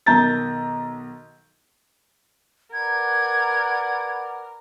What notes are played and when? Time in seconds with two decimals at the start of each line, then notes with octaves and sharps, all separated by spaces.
0.06 B1 D#3 A#5 G6 A6
2.73 A#4 B4 D5 F#5 G#6